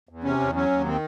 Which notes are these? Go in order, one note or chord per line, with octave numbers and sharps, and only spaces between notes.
E2
C3 C#4
E2
F#3 C#4
D#2
D#3 C4